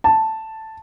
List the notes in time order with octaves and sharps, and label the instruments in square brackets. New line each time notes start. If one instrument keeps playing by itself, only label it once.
[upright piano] A5